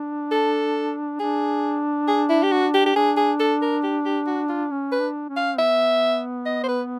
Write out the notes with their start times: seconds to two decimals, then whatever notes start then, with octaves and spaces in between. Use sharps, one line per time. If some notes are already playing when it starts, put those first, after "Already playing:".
Already playing: D4
0.31 A4
1.20 D4 G#4
2.08 G#4
2.29 E4
2.43 G4
2.52 F#4
2.74 G4
2.86 G4
2.95 D4 G#4
3.17 G#4
3.40 A4
3.62 A#4
3.83 G4
4.05 G4
4.27 F#4
4.49 F4
4.71 C#4
4.92 B4
4.99 D4
5.29 C#4
5.37 F5
5.58 B3 E5
6.46 D#5
6.64 C5
6.68 B4